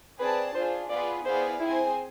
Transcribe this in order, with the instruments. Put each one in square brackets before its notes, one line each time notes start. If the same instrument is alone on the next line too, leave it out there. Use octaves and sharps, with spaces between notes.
[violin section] C4 G#4 D5 A5 [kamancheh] B4
[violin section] D4 F4 G#4 [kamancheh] C5
[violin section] B3 F4 G#4 B4 [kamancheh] D5
[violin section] B3 E4 G#4 D5 F5 [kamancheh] C5
[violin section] C4 G#4 C5 G#5 [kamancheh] E4